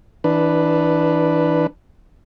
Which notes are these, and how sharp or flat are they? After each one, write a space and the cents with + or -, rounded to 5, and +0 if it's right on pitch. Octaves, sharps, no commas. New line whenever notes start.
E3 -25 D4 +0 B4 +0